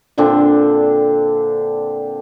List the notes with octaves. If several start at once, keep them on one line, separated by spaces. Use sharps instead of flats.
A#2 D3 C4 D4